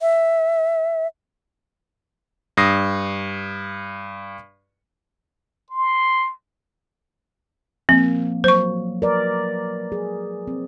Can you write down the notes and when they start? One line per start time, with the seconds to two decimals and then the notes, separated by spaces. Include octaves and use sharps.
0.01 E5
2.57 G2 D#6 A#6 C7
5.71 C6
7.89 F3 A#3 C4
8.44 F#3 C5 C#6
9.02 A#4 B4 D5
9.92 G#4
10.47 C4